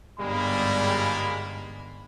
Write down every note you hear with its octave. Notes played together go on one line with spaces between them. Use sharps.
G1 G#2 G3 G#3 A#3 B5